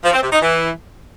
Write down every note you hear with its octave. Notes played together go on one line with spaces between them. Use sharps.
F3
C4
C3
D#4
E3